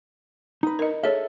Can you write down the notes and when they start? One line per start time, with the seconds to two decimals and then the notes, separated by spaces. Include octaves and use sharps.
0.63 D#4 B4
0.79 A#4 D#5
1.03 G#4 A4 C#5 E5